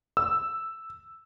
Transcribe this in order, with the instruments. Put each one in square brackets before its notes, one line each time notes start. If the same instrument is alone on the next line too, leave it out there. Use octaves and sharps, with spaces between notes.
[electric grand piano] E6